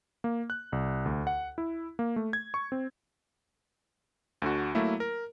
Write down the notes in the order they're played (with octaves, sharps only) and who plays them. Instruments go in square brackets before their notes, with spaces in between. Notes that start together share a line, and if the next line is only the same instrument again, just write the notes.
[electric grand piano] A#3
F#6
C2
D2
F#5
E4
A#3
A3
G#6
C#6
C4
D2 D3 F#4
F#3 A3 A#3 E4
A#4